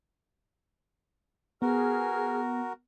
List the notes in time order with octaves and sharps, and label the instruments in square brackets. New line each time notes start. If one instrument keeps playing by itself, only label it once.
[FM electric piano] B3 [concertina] F#4 A#4 [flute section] G#4 F6